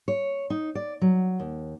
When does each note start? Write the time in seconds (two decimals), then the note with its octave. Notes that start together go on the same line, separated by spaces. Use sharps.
0.08 C#5
0.50 D#4
0.75 D5
1.02 F#3
1.40 D#2